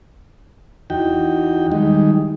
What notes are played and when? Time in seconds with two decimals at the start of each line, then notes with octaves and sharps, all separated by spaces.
0.90 E2 D#4 F#4 G5
1.72 D#3 G3 G#3 D#4